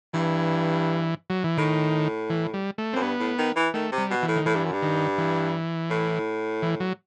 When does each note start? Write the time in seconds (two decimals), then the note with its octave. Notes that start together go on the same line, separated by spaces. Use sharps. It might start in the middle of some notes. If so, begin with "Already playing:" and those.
0.14 G2 E3
1.30 F#3
1.44 E3
1.57 A2 D#3
2.30 E3
2.54 G3
2.78 A3
2.93 F#2 C4
3.02 G2 B3
3.20 A2
3.38 D#3
3.56 E3
3.74 D#3 A3
3.92 C3
3.98 G3
4.11 B2
4.22 E3
4.28 A2
4.36 D#3
4.46 A2 E3
4.55 G2
4.64 F#2
4.73 G2
4.82 D#3
5.18 E3
5.90 A2
6.62 E3
6.80 F#3